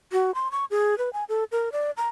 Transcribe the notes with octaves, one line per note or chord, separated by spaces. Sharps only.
F#4
C6
C#6
G#4
B4
G#5
A4
A#4
D5
A#5